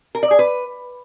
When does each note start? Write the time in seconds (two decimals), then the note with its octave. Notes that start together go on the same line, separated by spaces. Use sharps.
0.15 A#4
0.23 D5
0.31 G#4
0.39 B4